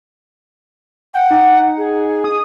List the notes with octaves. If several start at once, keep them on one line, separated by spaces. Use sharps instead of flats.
F#5 G5
D#4
G#4
D#6